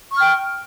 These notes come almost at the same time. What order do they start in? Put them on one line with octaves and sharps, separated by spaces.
C#6 F6 G5